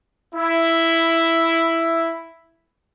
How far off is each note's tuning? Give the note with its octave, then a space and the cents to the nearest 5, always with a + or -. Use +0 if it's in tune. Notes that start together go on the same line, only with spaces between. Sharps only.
E4 +5